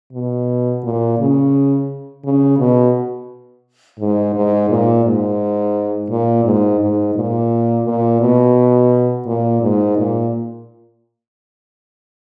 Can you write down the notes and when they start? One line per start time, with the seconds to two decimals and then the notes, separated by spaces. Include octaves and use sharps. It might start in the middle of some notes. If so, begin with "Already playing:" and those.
0.13 B2
0.83 A#2
1.19 C#3
2.24 C#3
2.59 B2
4.00 G#2
4.34 G#2
4.69 A#2
5.05 G#2
6.10 A#2
6.45 G#2
6.80 G#2
7.15 A#2
7.85 A#2
8.21 B2
9.26 A#2
9.61 G#2
9.97 A#2